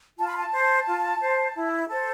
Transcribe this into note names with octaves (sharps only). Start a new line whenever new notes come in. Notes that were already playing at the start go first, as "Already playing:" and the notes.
F4 A5
B5
A5
C5
F4
C5
E4
A4 C5